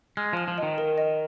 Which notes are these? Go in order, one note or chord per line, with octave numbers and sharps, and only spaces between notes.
G#3 F6
F3 F6
F3
D#3 D#5
A#4
D#5